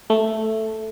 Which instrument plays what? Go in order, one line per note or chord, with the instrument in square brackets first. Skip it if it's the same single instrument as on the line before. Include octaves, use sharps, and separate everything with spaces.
[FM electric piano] A3